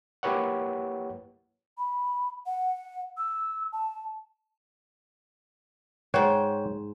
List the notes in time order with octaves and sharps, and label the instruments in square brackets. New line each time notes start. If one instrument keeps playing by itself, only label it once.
[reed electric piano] A#3 E4 G4 B4 C#5 F#5
[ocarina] B5
F#5
E6
A5
[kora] G#2 C5 [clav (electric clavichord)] C#5 F#5 G5